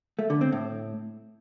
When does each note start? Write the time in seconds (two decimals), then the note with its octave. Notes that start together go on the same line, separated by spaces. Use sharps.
0.19 A3
0.30 D3
0.41 C4
0.52 A2